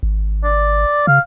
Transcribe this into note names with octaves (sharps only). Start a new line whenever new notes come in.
G#1
D5
C#3 F5